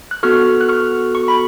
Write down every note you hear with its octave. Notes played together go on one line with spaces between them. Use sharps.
F#6
B3 F#4 A4 C#6 F6
F#6
C#6 F6
C#6
B5